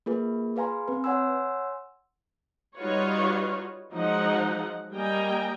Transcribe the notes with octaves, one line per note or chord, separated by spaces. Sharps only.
A#3 F4 G#4 B4
G#4 B4 F5 G#5 A#5 C6
C4 B4
C#5 F#5 G#5 C6 E6
G3 D#4 F4 F#4 B4 C#5
F3 F#3 G#3 D#4 F#5
G3 A#3 D#5 G5 G#5 A#5